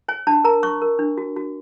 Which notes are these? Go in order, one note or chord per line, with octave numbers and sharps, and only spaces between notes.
C#5 G#5
D4 A5
A#4 A#5
C#5 C#6
A#4
D4
F#4
F#4